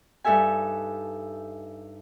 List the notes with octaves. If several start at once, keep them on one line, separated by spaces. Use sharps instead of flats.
G2 D#4 A4 E5 G#5